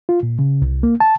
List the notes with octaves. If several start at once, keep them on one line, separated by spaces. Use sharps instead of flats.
F4
A#2
C#3
C2
A#3
A5